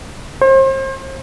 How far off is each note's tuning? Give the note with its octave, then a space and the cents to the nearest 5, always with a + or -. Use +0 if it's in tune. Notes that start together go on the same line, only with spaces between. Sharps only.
C5 +35